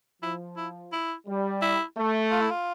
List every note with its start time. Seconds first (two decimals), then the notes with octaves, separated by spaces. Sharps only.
0.22 F3 E4
0.57 E4
0.92 E4
1.27 G3
1.62 E4
1.97 A3
2.31 F4
2.41 E4
2.50 F4